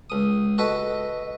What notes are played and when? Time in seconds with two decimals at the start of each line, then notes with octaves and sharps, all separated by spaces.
0.10 C#2 D#6
0.58 F#4 A4 B4 D#5